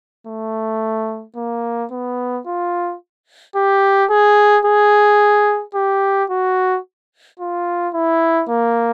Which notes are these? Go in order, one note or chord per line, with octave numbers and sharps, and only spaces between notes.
A3
A#3
B3
F4
G4
G#4
G#4
G4
F#4
F4
E4
A#3